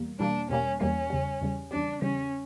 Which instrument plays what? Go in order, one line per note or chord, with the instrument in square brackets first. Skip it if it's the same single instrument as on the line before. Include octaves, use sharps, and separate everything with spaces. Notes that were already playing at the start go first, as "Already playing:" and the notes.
Already playing: [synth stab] E2 B2 G3 A#3
[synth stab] E2 B2 G3 A#3 [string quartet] D4
[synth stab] E2 B2 G3 A#3 [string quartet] C#4
[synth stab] E2 B2 G3 A#3 [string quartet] C#4
[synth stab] E2 C#3 G3
E2 C#3 G3
[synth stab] E2 C#3 G3 [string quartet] D4
[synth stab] E2 C#3 G3 [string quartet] C#4